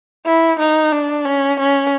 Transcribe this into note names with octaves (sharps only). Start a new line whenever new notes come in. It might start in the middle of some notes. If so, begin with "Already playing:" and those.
E4
D#4
D4
C#4
C#4